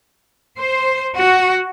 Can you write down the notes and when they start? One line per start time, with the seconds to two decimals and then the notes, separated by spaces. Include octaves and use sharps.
0.59 C5
1.17 F#4